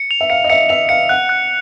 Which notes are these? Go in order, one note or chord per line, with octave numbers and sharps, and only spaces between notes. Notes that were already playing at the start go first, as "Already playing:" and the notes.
Already playing: C#7
F7
E5
F5 C#7
D#5
E5 C#7
E5 F7
F5 C#7
F#5 F#6
F#6